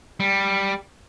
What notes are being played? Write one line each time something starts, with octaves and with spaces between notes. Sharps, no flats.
G3